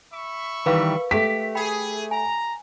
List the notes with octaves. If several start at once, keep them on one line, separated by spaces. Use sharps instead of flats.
E5 B5 C#6
D#3 E3 G3 A#4 B4 F5
A3 G4 B6
G#4 G5 B5
G#5 A#5